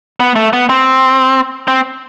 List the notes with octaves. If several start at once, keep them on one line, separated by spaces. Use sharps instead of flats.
B3
A3
B3
C4
C4